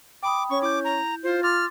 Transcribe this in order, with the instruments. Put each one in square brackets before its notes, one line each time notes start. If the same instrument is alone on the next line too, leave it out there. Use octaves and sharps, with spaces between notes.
[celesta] G5 B5 D#6 [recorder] D6
[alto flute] C#4 [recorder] C#6
[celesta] E4 G6 [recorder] D6
[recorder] A#5
[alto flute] F4 [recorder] C5
[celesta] C6 D6 A6 [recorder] F6